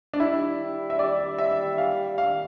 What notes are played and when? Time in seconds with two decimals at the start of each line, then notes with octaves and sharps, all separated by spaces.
0.13 D4
0.20 G3 E4
0.90 E5
0.98 G3 D5
1.38 E5
1.78 F5
2.18 F5